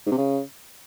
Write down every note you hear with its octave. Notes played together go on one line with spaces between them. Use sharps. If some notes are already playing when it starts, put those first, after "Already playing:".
G#2
C3
C#3